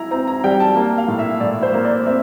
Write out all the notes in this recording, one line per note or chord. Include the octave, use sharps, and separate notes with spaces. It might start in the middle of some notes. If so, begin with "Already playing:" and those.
Already playing: E4 A#5
C4 A#5
A#5
G3 G5
A5
A#3
F5
A2
E5
A2 D5
C5
A#3
D5
C4 E5